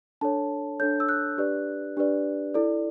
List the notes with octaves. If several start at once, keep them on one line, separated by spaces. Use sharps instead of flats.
D4 A4 C#5 A5
D4 A4 C#5 G6
E6
F#6
D4 G4 B4 D5
D4 G4 B4 D5
E4 A4 D5